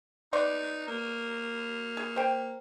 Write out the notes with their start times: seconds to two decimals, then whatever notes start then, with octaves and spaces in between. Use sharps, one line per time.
0.33 B3 D#4 D5 C6
0.88 A#3
1.97 G#4
2.16 C5 G5